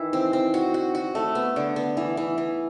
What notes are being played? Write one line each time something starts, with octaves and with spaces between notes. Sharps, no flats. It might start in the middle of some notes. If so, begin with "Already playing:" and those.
Already playing: D#3 E3 E4
C4
C4
F#4
F#4
F#4
A3
B3
D3
B3
E3
E3
E3